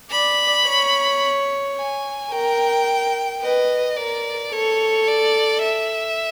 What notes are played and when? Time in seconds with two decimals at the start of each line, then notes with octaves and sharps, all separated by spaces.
0.11 D5 B5
0.66 C#5
1.76 G#5
2.32 A#4 G5
3.42 B4 D#5
3.97 A#4 D5
4.53 A4 C#5
5.08 D5
5.63 E5